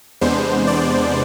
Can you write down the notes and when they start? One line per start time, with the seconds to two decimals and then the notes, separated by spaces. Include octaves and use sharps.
0.21 E2 C3 G#3 B3 D4 C5
0.68 D5